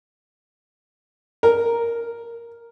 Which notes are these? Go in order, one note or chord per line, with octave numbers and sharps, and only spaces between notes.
A#4